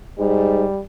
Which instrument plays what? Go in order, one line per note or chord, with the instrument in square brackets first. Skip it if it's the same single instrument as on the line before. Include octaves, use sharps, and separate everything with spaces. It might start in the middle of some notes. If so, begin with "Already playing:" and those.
[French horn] G#2 [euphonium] G3